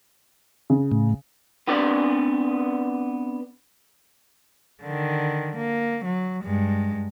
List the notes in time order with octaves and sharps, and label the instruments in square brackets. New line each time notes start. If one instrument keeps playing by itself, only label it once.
[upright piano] C#3
[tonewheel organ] A2
[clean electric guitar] B3 C4 D4 B4 D5
[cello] D3 D#3
A#3
F#3
G2 G#3